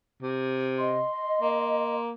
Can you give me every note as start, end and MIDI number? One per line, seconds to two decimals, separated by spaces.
0.23 1.04 48
0.78 1.96 75
0.78 2.00 84
1.41 2.14 58